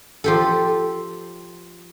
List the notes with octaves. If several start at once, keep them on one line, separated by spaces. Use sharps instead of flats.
F3 G4 A4